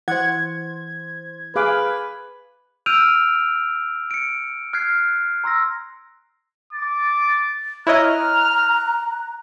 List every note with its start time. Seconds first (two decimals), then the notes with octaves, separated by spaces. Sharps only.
0.08 E3 C5 F#5 G#6
1.56 G#4 B4 F5 D6
2.86 E6 F6 G6 D7 D#7 F7
4.11 C#7 D7
4.73 F6 F#6 G#6 C7
5.44 A#5 C6 E6 A#6
6.73 D6 A6
7.87 E4 C#5 D#5 A#5 F6 F#6